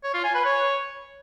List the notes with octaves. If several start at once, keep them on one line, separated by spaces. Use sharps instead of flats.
C#5
F4
G#5
B4
C#5